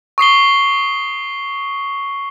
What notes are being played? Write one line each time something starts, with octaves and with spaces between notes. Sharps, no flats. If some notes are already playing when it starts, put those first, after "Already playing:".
C#6 D#6 C7 G7